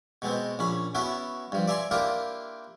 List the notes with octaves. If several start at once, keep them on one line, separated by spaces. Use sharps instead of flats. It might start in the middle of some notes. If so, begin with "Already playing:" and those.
B2 G#3 B3 C4
A#1 C#4 B5
B3 C#4 E4 F#4 B4
G2 F3
D5 E5 G#5 A#5 C6
A#3 D4 E4 F4 G4 A#4